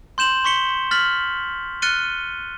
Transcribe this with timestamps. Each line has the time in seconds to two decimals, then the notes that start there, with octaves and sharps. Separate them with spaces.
0.18 C6 G6 E7 F#7
0.44 C6 C#6 B6 C#7 G7
0.91 F6 A6 B6 F#7
1.82 F6 F#6 A6 C#7 D#7 G7